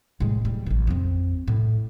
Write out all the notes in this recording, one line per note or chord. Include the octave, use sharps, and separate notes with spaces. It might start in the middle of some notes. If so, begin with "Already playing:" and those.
A2 G#3
D1 G3
A1 B2
F2 C4
A2